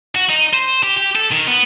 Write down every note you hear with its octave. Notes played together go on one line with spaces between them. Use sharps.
F#4
D#4
C5
G4
G4
A4
D#3
B3